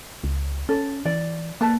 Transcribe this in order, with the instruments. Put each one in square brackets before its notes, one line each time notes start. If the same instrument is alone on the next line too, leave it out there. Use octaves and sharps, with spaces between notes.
[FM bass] C#2
[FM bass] C#4 [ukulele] A4
[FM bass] E3 [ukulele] D5
[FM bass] A#3 [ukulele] B4 D5 A5